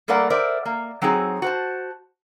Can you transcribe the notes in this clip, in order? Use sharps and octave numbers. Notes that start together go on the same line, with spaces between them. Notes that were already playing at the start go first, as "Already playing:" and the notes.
G3 A3 A#3 A#4 D5 F#5
A#4 C5 D5 E5
A#3
F#3 C4 D#4 F#4 G#4
F#4 C5 A5